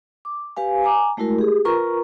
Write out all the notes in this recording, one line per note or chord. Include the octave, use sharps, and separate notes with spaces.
D6
G4 B4 F5 G#5
G#5 A#5 D6
G#3 A3 E4 F#4 A#4
G4 G#4
F4 A#4 B4 A#5 C#6